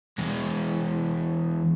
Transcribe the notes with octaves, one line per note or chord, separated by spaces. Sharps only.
E2 G#3